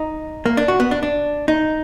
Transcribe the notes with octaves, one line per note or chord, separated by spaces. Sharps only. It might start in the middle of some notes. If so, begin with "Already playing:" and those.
Already playing: D#4
A#3
D4
F#4
B3
D4
D4
D#4